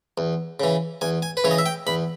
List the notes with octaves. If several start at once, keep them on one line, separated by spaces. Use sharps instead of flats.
E2
C#3 E3
E2 G#5
G#5
B4
C#3 E3 C#5
D#5
E5
G5
E2 B5